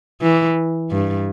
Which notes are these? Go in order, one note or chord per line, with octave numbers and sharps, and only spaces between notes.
E3
G2